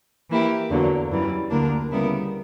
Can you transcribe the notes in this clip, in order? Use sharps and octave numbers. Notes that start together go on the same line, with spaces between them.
E3 A#3 E4 G4
E2 D3 F#3 A#3
F#2 E3 G3
D2 D3 A#3 D4 A#4
C#3 G3 B3 E4 A#4